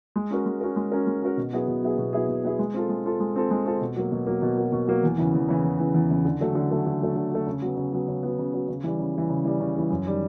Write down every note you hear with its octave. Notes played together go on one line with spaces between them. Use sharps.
G#3
C#4 F#4 A#4
G#3
C#4 F#4 A#4
G#3
C#4 F#4 A#4
G#3
C#4 F#4 A#4
B2
F#3 B3 E4 G#4
B2
F#3 B3 E4 G#4
B2
F#3 B3 E4 G#4
B2
F#3 B3 E4 G#4
G#3
C4 F4 A4
G#3
C4 F4 A4
G#3
C4 F4 A4
G#3
C4 F4 A4
B2
F#3 A#3
B2
F#3 A#3
B2
F#3 A#3
B2
F#3 A#3
E2
C#3 E3
E2
C#3 E3
E2
C#3 E3
E2
C#3 E3
D3
F#3 A3
D3
F#3 A3
D3
F#3 A3
D3
F#3 A3
C#3
F#3 B3
C#3
F#3 B3
C#3
F#3 B3
C#3
F#3 B3
C#3
E3 G3
C#3
E3 G3
C#3
E3 G3
C#3
E3 G3
F#2
D#3 G3